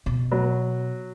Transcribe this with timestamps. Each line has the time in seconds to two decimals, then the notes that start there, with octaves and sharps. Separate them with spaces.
0.06 B2
0.32 F#3